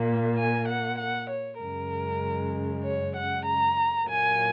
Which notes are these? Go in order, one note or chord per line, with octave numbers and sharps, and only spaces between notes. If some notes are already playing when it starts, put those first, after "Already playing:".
Already playing: A#2 A#3
G#5
F#5
F#5
C#5
F#2 C#3 G#3 A#4
C#5
F#5
A#5
A#2 F#3 A#3 G#5